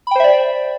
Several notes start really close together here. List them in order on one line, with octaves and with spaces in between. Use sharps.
B5 G5 C5 E5 D5